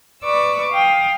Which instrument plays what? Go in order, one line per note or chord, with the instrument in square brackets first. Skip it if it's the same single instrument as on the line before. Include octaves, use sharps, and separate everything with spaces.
[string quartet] B4 D5 C#6 D6 E6
F5 G5 D#6